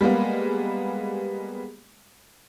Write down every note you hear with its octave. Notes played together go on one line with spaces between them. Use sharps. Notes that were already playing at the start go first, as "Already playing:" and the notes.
G3 G#3 A#3 B3